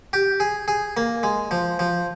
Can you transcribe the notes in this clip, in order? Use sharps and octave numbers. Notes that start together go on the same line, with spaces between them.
G4
G#4
G#4
A#3
G#3
F3
F3